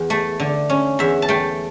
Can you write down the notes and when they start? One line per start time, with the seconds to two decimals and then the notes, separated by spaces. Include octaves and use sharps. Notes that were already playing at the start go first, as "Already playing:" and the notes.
Already playing: E2
0.10 A3
0.40 D3
0.70 C#4
0.99 E2 E5
1.22 A5
1.28 A3 G5